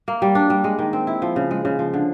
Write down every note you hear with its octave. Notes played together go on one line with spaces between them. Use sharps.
A#3
G3
D4
G3
G#3
D#3
C4
E4
F3
C#3
G#3
C#3
F3
D3